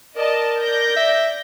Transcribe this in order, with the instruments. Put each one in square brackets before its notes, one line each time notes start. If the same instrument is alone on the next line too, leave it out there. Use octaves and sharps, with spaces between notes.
[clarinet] A#4 [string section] D5 D#5 A5
[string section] D5 G6 A#6
[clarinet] E5